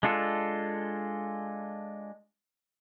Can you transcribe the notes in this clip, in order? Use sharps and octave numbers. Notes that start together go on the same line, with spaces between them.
G#3 D4 F4 A4